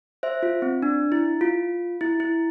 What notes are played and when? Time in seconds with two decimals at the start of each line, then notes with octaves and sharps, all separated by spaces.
0.23 C5 E5
0.43 F4
0.62 C4
0.82 D4
1.12 E4
1.41 F4
2.01 E4
2.20 E4